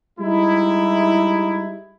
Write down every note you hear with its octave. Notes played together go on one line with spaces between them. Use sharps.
G3 G#3 D#4 E4